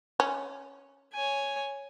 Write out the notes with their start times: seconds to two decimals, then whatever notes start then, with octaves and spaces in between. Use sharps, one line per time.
0.20 C#4
1.14 C#5 G#5